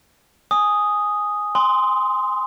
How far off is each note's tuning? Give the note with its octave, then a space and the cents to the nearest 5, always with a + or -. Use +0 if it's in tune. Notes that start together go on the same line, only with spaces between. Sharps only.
G#5 +0 D#6 +0
G#5 -30 C6 -10 D#6 +30